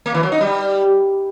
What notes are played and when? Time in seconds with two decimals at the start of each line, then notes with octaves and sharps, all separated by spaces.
0.06 A#3
0.14 E3
0.23 F#3
0.32 D#4
0.41 G3